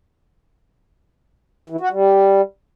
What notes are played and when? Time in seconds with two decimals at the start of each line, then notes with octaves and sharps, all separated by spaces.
1.70 E3
1.81 F#4
1.91 G3